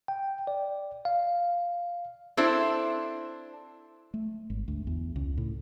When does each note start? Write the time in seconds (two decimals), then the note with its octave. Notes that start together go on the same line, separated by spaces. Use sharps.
0.08 G5
0.47 D5
1.05 F5
2.37 C4 D4 E4 A4 C5
4.14 A3
4.50 G#1
4.68 D2
4.87 E2
5.16 C#2
5.37 A2